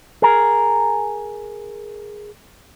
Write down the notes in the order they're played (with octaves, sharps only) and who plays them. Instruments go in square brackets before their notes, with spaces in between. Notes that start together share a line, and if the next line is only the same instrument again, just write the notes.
[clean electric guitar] G#4 A#4